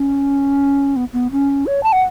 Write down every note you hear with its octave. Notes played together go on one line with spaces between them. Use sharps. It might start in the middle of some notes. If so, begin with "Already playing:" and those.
Already playing: C#4
B3
B3
C#4
C#5
A5
F#5